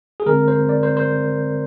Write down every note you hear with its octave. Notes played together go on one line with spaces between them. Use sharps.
G#4
D3 G#3 C4 A#4
C5
D5
C5
C5